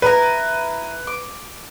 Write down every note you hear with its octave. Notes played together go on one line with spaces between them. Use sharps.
E4 A#4 B4 A#5
D6